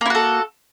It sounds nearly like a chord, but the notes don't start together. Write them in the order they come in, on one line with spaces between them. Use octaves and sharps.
A#3 E4 F#4 A4